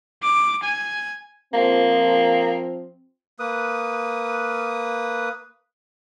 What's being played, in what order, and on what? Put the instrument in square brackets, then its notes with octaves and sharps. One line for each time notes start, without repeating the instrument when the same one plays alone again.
[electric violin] D6
G#5
[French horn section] F3 C4 [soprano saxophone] A#3
[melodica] A#3 B4 D#6